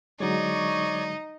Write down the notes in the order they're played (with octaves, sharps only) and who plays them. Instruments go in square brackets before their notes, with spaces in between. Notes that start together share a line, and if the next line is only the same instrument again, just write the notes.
[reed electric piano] D3 F#3 G#3 [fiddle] D#4 [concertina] C#5 D5 C#6